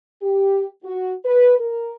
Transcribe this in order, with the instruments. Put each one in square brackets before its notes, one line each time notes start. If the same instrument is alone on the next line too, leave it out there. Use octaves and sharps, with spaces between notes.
[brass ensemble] G4
F#4
B4
A#4